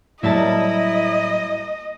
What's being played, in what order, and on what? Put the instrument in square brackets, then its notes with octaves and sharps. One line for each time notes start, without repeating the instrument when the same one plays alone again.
[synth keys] A2 F#3 G3 [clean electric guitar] A#3 E5 A5 [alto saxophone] E4 [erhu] D#5